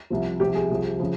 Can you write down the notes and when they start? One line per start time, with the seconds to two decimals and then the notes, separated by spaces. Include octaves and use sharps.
0.10 C2 C3 F3
0.40 C2 C3 F3 G4
0.55 G#4
0.71 C2 C3 F3
1.00 C#3 F3